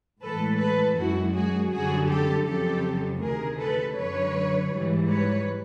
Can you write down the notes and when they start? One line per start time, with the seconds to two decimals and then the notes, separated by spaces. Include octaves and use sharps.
0.23 A2 E3 G#3 A4 B4
0.60 A4 B4
0.98 F#2 D#3 G#3 E4 F#4
1.35 F#4 G#4
1.73 F#2 D3 G3 F#4 G#4
2.10 G4 A4
2.47 F2 C#3 F#3 G4 A4
3.22 D2 C3 D#3 G#4 A#4
3.60 A4 B4
3.97 F#2 D3 F#3 B4 C#5
4.72 G#2 E3 G3
5.09 B4 C#5